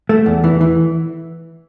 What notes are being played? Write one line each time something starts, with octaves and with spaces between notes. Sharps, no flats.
A3
E2
E3
E3